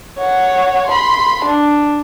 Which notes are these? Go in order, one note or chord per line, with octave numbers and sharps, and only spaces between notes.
C#5 F#5
B5 C6
D4